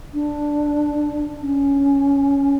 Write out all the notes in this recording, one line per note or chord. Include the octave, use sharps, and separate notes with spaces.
D4
C#4